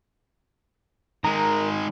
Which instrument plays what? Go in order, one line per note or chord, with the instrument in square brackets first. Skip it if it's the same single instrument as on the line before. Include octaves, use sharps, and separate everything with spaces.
[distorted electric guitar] D#3 G#3 [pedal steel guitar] A#4 A#5